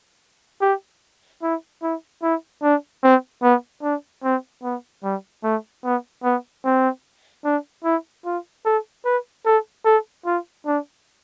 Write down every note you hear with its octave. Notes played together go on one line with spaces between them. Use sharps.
G4
E4
E4
E4
D4
C4
B3
D4
C4
B3
G3
A3
B3
B3
C4
D4
E4
F4
A4
B4
A4
A4
F4
D4